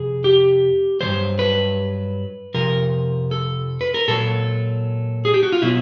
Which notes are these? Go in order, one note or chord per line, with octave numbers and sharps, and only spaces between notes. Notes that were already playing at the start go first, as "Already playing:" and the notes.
Already playing: F2 C3 G#4
G4
G2 D#3 F#3 C5
B4
F2 C3 F3 A#4
A4
B4
A#4
A#2 F#3 A4
G#4
G4
F#4
F4
B2 F#3 E4